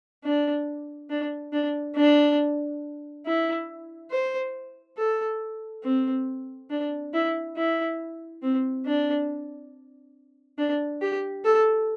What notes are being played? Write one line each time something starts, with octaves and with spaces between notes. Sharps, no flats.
D4
D4
D4
D4
E4
C5
A4
C4
D4
E4
E4
C4
D4
D4
G4
A4